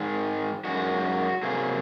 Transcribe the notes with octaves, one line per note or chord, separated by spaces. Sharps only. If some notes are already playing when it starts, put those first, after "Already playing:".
Already playing: G#2 D#3 G#3
F#2 D#3 G#3 F#4
C3 F#3 A#3 G#4